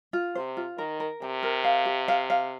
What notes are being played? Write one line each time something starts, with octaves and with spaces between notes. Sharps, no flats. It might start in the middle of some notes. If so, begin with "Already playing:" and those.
F4
C3 C5
F4
D#3 A#4
A#4
C3 G5
A#4
F5
G4
F5
F5